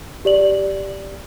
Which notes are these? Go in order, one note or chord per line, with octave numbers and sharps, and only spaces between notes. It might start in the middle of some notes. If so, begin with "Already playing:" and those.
G4 D5 F#7